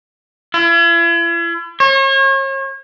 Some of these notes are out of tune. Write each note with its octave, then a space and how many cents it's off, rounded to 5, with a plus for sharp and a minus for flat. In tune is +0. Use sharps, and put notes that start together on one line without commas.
E4 +45
C#5 -40